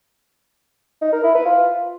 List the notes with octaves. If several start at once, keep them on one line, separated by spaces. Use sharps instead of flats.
D#4
A#4
E4
B4
F4